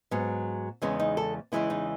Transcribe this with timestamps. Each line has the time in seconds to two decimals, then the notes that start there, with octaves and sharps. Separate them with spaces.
0.11 G#2 F#3 B3
0.82 E2 C#3 E3 G#3 B3 C#4
1.00 D#4
1.17 A4
1.52 E2 C#3 E3 G#3 B3 E4
1.70 D#4